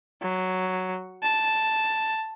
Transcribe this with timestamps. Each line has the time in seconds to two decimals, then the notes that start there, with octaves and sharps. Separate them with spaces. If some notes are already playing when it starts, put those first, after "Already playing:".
0.22 F#3
1.23 A5